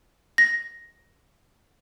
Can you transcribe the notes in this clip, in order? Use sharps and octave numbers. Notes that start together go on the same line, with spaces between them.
A#6